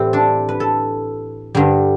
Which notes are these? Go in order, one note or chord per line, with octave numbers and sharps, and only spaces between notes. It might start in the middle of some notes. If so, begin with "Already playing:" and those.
Already playing: A2 E3 G3 C4
D4
B4
A4
G2 D3 G3